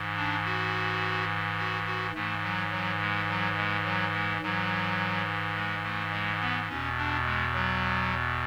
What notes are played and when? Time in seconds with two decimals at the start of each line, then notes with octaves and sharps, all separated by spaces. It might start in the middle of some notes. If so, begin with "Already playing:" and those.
Already playing: G#2 E3
0.16 D4
0.45 F#4
1.59 F#4
1.86 F#4
2.14 G#2 E3 A3
2.43 F#3
2.71 F#3
3.01 G#3
3.28 F#3
3.57 G#3
3.85 F#3
4.13 G#3
4.42 G#2 E3 F#3
5.55 G#3
5.83 A3
6.12 G#3
6.40 B3
6.69 E2 B2 C#4
6.97 D4
7.25 G#3
7.54 F#3